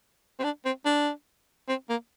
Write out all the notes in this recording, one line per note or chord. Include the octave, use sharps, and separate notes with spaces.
C4
D4
C4
D4
C4
A#3